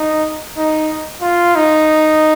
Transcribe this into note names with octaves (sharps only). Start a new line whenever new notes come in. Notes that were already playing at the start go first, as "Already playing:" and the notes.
Already playing: D#4
D#4
F4
D#4